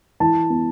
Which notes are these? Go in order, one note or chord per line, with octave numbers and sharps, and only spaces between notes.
E3 A5
B3